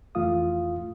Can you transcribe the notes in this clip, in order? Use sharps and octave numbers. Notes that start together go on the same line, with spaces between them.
F2 E3 A3 F4 F5 D#6